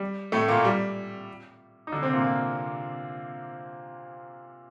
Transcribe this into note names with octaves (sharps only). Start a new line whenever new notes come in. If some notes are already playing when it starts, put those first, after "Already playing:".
Already playing: G3
A2 A3
A#2 A#3
G3
D#4
D3 D4
C3 C4
A#2 A#3
A#2 A#3